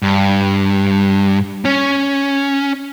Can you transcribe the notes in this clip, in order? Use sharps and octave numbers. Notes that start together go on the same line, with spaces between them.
G2
C#4